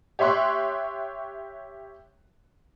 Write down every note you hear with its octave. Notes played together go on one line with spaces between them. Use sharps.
G4 C#5 E5 C6 C#6 F#6